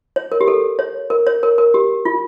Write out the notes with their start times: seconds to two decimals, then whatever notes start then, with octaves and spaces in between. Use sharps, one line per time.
0.16 C#5
0.32 A#4
0.41 G4
0.48 A4
0.79 C#5
1.10 A#4
1.27 C#5
1.43 A#4
1.58 A#4
1.74 G4
2.05 F4